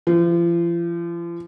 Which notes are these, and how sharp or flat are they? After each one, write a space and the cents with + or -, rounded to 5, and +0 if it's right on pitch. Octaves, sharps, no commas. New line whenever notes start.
F3 -40